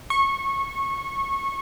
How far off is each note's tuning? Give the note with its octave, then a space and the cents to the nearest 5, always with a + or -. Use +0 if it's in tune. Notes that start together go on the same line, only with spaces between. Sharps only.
C#6 -20